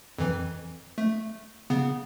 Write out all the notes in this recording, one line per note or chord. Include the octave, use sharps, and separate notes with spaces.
F2 E3
A3
C#3 B3